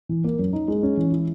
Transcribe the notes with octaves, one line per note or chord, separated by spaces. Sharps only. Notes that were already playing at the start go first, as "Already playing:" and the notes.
E3
A#3
F#2
D#4
G#3
C#4
E3
E4